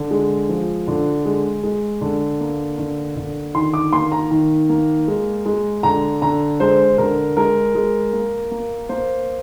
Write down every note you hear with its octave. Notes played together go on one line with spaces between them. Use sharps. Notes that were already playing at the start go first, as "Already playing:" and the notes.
Already playing: D3
G#3
F3
D3
G#3
G#3
D3
A#3
D3
D3
D#3 C6
D6
A#3 C6
A#5
D#3
A#3
G#3
G#3
D3 A#5
D3 A#5
G#3 C5
D3 A#4
G#3 A#4
G#3
A#3
A#3
A#3 C5